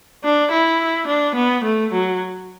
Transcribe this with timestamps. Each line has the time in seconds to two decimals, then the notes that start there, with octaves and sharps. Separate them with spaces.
0.24 D4
0.52 E4
1.07 D4
1.35 B3
1.64 A3
1.92 F#3